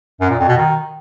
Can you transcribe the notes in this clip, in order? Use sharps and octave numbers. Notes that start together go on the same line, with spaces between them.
F#2
A#2
F2
B2
D#3